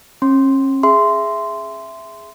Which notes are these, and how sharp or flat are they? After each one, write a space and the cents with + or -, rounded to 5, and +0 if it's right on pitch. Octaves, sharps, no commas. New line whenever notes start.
C#4 -40 C6 +0
G#4 +0 E5 +10 C6 -15